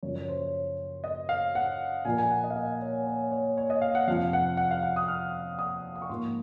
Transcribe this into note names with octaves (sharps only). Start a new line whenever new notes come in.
F#2 C#3 F3 C#5
C#5
C5
C#5
D#5
F5
F#5
A#2 F3 A#3 G#5
G#5
F#5
D#5
F5
D#5
C#5
C#5
C#5
C#5
D#5
F5
F#5
F2 C3 F3 F5
F#5
F#5
F5
F#5
D#6
F6
D#6
D#6
C#6
G#2 F3 A#3 C6